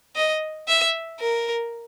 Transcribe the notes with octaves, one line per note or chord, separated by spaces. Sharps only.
D#5
E5
A#4